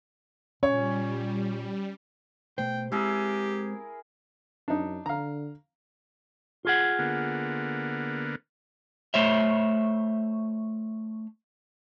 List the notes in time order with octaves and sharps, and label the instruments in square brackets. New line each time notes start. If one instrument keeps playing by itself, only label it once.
[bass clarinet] A#2 [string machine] G3 [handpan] C#4 [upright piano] C#5
[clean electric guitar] B2 A3 C5 [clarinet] G5
[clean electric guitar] G#3 C4 [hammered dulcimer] E4 G#4 A#4 [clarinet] G4
[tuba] F#2 [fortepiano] D4 D#4
[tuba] D3 [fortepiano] F5 A#5
[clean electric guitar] F4 G#4 F#5
[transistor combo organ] D3 A#3 B3
[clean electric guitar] A3 C5 C#5 E5